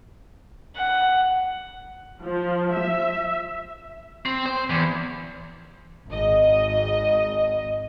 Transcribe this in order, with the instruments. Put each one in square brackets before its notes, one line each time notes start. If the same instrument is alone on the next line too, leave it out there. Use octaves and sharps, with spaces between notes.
[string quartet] F#5
[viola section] F3
E5
[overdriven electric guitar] C4
C5
E2
[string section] G#1 D#5